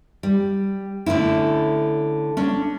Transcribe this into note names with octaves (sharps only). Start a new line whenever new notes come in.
G3
D3 A3 C#4 E4
C#4 D4